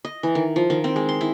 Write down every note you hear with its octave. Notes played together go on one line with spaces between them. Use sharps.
D#5
E3
D#3
F3
D#3
C4
G#3
C6
E4